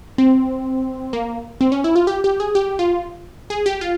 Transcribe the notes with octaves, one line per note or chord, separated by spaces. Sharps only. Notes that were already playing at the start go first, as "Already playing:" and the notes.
C4
A#3
C4
C#4
E4
F4
G4
G4
G#4
G4
F4
G#4
G4
F4